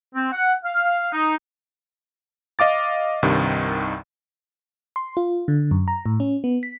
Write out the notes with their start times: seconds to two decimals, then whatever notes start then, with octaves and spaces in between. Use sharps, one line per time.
0.15 C4
0.32 F#5
0.64 F5
1.13 D#4
2.59 D#5 F5 D6 A6
3.23 C2 G2 C3 D#3
4.96 C6
5.17 F4
5.48 D3
5.71 F#2
5.88 A#5
6.06 A2
6.20 C#4
6.44 B3
6.63 B6